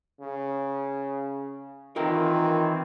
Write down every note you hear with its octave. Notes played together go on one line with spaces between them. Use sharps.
C#3
D#3 E3 C4 F4 A#4 G5